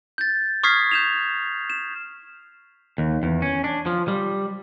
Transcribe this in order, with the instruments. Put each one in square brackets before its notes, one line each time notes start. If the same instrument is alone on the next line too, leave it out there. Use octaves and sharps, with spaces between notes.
[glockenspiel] G6 A6
C#6 D#6 F6 G#6 B6 C7
G6 E7 F7
E7
[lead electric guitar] D#2
E2
C#4
D4
F3
G3